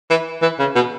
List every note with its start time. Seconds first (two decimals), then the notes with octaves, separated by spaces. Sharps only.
0.10 E3
0.42 E3
0.59 C#3
0.75 B2